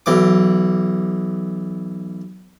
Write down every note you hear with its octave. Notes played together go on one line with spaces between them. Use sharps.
B1 E3 D6